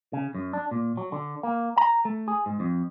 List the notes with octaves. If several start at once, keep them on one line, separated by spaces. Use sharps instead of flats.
C#3
F#2
D4
A#2
F#3
D3
A#3
A#5
A3
G#4
G#2
F2